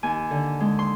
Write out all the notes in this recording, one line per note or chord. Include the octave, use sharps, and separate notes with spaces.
D#2 G#5
D3
G#3
C6